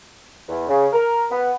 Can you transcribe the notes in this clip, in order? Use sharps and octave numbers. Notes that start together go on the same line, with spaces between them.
E2
C#3
A#4
B3